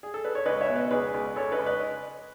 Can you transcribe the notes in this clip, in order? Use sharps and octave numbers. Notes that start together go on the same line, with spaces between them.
G#4
A4
B4
C#5
C#2 B4 D#5
C#5 E5
B2
B4 D#5
C#2 G#4 B4
C#2
C#2 A4 C#5
B4 D#5
C#2
B4 D#5